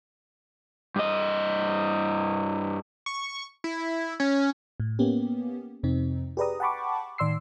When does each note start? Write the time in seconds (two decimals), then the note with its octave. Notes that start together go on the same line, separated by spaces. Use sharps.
0.96 G2 D#5
3.06 C#6
3.64 E4
4.20 C#4
4.80 A2
4.99 A#3 B3 C#4 G4
5.83 F2 C3 C4 D#4
6.37 G4 G#4 B4 D5 A#5 D#6
6.60 F#5 G5 A5 B5 C#6 D6
7.18 A2 D#3 D5 C6 E6 C7